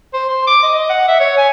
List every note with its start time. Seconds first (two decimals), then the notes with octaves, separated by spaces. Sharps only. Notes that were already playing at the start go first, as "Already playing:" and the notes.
0.13 C5
0.29 C6
0.47 D6
0.63 D#5
0.74 D#5
0.89 F#5
1.08 E5
1.20 C#5
1.37 G#5